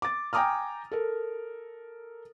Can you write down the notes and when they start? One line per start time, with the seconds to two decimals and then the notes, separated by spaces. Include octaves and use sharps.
0.02 D6 A6
0.33 G5 G#5 A#5 D6 D#6 F6
0.91 A4 A#4